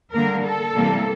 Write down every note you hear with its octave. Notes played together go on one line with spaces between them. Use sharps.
D3 G3 A#3 A#4
A4
C3 E3 G3 A#3